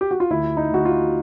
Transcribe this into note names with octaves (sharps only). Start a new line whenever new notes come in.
G4
F#4
F4
D2 E4
D#4
D2 F#4
F4